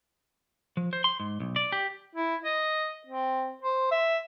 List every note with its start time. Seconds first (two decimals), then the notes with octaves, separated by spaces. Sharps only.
0.77 F3
0.93 C5
1.04 C6
1.20 G#2
1.40 B1
1.56 D5
1.72 G4
2.15 E4
2.45 D#5
3.06 C4
3.63 C5
3.91 E5